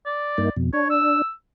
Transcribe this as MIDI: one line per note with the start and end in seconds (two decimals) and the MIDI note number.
0.06 0.53 74
0.38 0.49 43
0.38 0.49 58
0.38 0.49 63
0.56 0.71 41
0.56 0.71 47
0.73 1.22 62
0.73 0.85 73
0.90 1.30 88